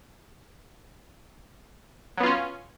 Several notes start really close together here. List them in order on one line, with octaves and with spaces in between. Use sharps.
F#3 B3 F4 C#4